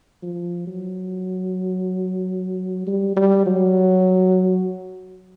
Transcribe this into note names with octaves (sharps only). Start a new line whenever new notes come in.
F3
F#3
G3
G3
F#3